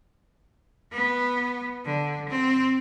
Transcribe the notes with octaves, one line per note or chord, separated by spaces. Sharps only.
B3
D3
C4